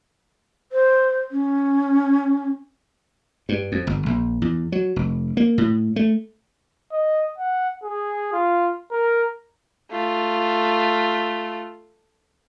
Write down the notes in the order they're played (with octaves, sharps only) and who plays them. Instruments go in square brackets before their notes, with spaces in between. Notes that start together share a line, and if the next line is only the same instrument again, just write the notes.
[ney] C5
C#4
[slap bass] G2
F2
G1
A#1
E2
F#3
F1
A#3
A2
A3
[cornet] D#5
F#5
G#4
F4
A#4
[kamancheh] A3 F4